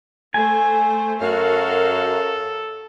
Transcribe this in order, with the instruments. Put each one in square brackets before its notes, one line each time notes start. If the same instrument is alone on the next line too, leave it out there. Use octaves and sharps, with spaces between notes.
[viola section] A3 C5 [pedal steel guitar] G#5
[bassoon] F#2 [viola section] F#4 A#4 F5 [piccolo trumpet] A4